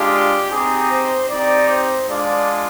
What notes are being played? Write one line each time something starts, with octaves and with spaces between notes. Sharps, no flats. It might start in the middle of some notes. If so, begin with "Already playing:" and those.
Already playing: G#3 D4 F4 G4
C4 D#4 G4 G#4
C5
C4 D#4 G4 D5
C5
G#3 D4 F4 D5